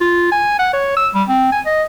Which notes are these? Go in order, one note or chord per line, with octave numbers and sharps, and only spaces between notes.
F4
G#5
F#5
C#5
E6
G3
C4
G#5
D#5